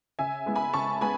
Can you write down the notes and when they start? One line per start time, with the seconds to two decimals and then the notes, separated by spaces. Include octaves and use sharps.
0.19 C#3 E5 G#5
0.46 G#3 B3 E4
0.55 G#5 B5
0.73 C#3 A5 C#6
1.01 G#3 B3 G#5 B5